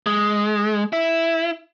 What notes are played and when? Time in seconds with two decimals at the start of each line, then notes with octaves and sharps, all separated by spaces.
0.06 G#3
0.93 E4